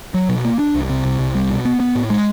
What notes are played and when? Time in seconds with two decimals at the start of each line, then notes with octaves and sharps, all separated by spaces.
0.14 F#3
0.29 B2
0.45 A#3
0.59 D4
0.75 C2
0.90 C3
1.05 C2
1.19 C2
1.35 G3
1.50 B2
1.65 B3
1.80 B3
1.95 A2
2.10 G#3